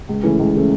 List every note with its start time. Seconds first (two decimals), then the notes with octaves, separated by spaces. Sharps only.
0.09 C#2
0.23 C#3 E3 A3 C#4
0.39 C#2
0.55 C#3 E3 A3 C#4